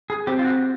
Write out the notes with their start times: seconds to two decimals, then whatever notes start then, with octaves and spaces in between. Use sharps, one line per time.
0.10 G#4
0.27 C4 G4
0.39 F4
0.44 F#4